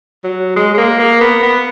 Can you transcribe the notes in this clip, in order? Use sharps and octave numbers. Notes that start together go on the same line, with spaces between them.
F#3
G#3
G#3
A#3
A#3
B3
B3